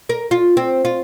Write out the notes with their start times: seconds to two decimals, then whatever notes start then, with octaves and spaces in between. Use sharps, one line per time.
0.09 A#4
0.31 F4
0.57 C4
0.85 F4